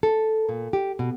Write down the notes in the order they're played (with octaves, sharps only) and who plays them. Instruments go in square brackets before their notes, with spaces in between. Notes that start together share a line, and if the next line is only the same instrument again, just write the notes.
[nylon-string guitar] A4
A#2
G4
B2